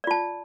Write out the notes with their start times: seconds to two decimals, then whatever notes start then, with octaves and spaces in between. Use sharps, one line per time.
0.04 D5
0.07 F4
0.11 A5